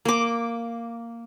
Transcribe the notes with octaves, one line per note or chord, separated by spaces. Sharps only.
A#3 D6